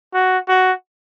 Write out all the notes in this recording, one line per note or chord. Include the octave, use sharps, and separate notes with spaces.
F#4
F#4